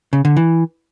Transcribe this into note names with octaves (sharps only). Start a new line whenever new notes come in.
C#3
D3
E3